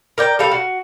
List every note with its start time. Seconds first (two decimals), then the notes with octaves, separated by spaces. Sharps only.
0.18 A#4 D5 G5
0.39 G3 A4 F5
0.51 F#4